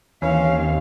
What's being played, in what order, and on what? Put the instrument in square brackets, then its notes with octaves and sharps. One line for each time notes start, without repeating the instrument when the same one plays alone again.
[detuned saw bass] D#2 [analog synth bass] E3 [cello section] C4 F5 [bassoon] C#4